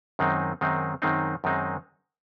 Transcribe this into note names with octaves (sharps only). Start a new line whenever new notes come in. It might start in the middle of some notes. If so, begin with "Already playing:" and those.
F#2 D#3 G#3 C4 D#4
F#2 D#3 G#3 C4 D#4
F#2 D#3 G#3 C4 D#4
F#2 D#3 G#3 C4 D#4